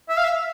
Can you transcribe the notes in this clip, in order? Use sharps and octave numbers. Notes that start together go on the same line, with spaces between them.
E5
F5
E5